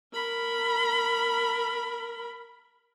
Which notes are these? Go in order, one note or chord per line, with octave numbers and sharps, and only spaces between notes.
A#4 B5